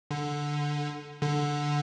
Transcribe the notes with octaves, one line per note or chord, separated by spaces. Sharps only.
D3
D3